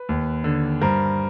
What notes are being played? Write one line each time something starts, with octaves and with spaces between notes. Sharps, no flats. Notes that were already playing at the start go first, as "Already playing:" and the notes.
Already playing: B4
D#2
D3
G2 A#4 C5